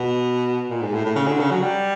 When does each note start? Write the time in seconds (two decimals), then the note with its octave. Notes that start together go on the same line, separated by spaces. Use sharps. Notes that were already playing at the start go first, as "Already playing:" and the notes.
Already playing: B2
0.70 A#2
0.82 G#2
0.93 A2
1.05 A2
1.16 C#3
1.27 D3
1.40 C#3
1.50 F#3
1.63 G3